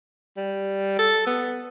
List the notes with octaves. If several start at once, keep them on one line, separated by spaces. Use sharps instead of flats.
G3
A4
B3